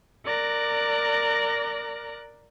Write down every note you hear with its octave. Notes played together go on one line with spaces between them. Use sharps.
A#4 D5 F#6 A#6